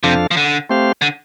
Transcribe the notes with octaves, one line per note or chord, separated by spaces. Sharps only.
F2 C3 F3 D4 A4 F5
F3
D3
A3 C4 G4 C5 F5
D3